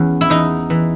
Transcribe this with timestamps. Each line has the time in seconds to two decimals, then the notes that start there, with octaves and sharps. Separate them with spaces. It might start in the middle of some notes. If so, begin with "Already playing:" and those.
Already playing: E2 C#4
0.21 E4
0.30 E2 D#4
0.70 E3